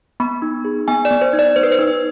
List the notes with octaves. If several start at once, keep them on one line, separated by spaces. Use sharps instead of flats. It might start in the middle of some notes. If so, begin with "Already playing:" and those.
B3 B5
D#4
G#4
B3 G#5
D5
B3
C5
D#4
D5
B3 C5
B4
C5
D#4